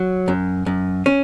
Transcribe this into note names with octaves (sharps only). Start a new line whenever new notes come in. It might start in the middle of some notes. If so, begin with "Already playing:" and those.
Already playing: F#3
F#2
F#2
C#4